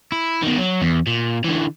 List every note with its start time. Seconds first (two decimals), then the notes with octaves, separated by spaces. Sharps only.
0.12 E4
0.43 B2 D#3
0.59 F#3
0.82 E2
1.07 A#2
1.44 D3 E3